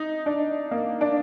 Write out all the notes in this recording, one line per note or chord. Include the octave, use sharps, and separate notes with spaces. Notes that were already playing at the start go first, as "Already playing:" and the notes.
Already playing: D#4
D4
A#3
D4